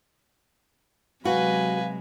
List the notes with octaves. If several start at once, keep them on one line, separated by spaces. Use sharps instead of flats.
C3 F#3 G#3 F#4 B4 F5 G#5